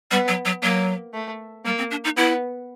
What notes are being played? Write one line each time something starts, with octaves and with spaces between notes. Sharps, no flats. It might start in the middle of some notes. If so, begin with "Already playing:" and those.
G3 B3
F#3
F#3
F#3 A#3
A3
G3 A#3
C4
D4
D#4
B3 E4